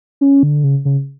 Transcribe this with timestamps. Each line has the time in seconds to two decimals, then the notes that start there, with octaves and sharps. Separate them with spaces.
0.21 C#4
0.43 D3
0.64 C#3
0.85 C#3